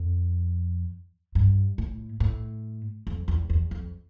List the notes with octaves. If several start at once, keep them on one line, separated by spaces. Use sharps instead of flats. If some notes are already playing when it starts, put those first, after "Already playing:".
Already playing: F2
G2
A2
A2
F2
E2
E2
F2